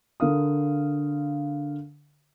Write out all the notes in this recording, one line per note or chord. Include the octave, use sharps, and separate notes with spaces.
D3 A#4 F5 D#6